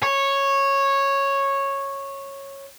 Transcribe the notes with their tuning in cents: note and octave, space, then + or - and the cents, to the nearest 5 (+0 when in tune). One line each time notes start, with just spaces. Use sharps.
C#5 -10